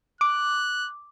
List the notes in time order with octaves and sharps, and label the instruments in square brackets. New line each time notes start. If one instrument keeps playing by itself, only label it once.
[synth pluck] D6 [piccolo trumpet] F#6